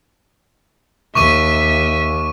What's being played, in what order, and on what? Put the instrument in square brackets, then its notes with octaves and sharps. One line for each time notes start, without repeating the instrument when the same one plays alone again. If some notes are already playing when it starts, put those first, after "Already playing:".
[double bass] D#2 [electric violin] E5 B6 [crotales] C#6 D6 D#7